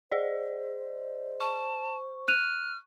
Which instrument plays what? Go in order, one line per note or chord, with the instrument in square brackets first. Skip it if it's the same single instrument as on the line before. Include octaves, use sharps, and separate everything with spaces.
[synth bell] G#4 D5 D#5 [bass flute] C5
[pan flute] A5 [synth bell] C#6
[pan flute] F6 [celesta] F#6 D#7 F7